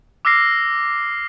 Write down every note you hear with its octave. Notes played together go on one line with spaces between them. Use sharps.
D6 E6 F6 A#6 C7